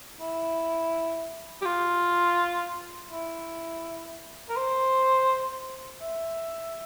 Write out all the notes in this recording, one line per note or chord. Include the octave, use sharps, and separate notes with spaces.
E4
G4
F4
E4
A#4
C5
E5